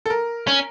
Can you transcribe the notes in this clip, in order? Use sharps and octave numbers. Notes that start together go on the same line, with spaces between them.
A4
A#4
C#4